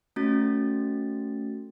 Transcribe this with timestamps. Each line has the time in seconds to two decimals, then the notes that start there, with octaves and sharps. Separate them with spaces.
0.16 A3 C#4 F#4 A6